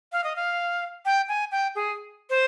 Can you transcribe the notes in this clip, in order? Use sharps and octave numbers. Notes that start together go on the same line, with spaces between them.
F5
D#5
F5
G5
G#5
G5
G#4
C5